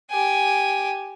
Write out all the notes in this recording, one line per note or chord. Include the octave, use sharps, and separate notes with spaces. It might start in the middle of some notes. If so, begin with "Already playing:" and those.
G4 G#5